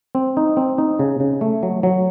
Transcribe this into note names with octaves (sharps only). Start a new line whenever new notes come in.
C4
D#4
C4
D#4
C#3
C#3
A3
F#3
F#3